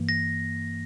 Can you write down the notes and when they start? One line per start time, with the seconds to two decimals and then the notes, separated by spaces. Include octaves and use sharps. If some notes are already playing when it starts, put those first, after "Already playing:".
Already playing: G2 E3 A#3
0.09 A#6